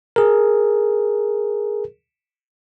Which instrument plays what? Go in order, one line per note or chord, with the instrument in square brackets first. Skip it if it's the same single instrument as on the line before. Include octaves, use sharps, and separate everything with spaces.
[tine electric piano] G#4 A#4